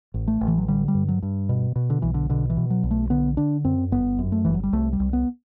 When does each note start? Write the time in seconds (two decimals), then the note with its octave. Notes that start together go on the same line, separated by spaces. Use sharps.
0.14 A1
0.28 A3
0.41 A1
0.48 E3
0.58 F#3
0.68 D3 G3
0.88 G3
0.94 G2
1.08 F#3
1.22 G2
1.49 B2
1.76 B2
1.90 D3
2.02 B1 E3
2.14 D3
2.29 B2 D3
2.50 E3
2.57 B2
2.70 F#3
2.83 B1
2.91 A3
3.10 D3 B3
3.37 D3 D4
3.65 F#2 C4
3.92 G1 B3
4.19 F#2
4.32 A3
4.45 G1 E3
4.54 F#3
4.63 G3
4.73 C2 A3
4.93 G3
5.00 C2
5.13 B3